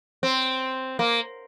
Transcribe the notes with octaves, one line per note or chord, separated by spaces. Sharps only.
C4
A#3